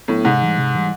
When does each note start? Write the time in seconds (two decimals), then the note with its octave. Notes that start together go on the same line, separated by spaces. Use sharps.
0.08 A2 F#3 B3 D4
0.25 G#2 C3
0.42 E3 G3
0.57 C3
0.74 E3 G3